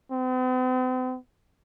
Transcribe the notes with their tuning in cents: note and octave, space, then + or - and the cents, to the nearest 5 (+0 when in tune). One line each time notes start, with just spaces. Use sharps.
C4 -45